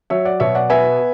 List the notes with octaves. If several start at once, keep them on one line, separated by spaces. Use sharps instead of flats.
F#3 C#5 E5
D5 F#5
B2 C#5 E5
D5 F#5
B3 E5 G#5